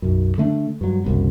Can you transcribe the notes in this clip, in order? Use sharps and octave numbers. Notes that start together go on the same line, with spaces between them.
B1 F#2
D3 A3 D4
G2 F#3
F#1 C2 B2